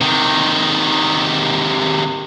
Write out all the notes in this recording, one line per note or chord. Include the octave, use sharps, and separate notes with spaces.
C3 D#3